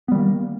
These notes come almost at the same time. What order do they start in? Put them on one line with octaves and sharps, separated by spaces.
B3 G3 D#3 A#3